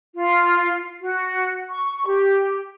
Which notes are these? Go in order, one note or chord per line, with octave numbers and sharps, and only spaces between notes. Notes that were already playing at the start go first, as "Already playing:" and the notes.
F4
F#4
C#6
G4